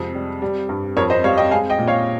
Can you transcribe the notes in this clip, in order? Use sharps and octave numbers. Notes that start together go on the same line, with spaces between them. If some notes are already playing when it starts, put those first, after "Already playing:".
Already playing: F2 C3 G#3
G3
G3
G2
F2 A#4 C#5
C5 D#5
G3 C#5 F5
D#5 G5
G#3 F5 G#5
D#5 G5
A#2
C#5 F5